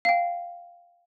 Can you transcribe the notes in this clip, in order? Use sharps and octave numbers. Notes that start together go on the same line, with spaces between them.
F5 G5